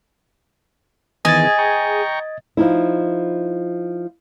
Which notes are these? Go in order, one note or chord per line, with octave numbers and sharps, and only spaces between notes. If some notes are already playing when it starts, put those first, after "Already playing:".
D#3 E3 B3 G#4 D#5 G#6 A6
G5 A#5 C#6
F3 D#4 E4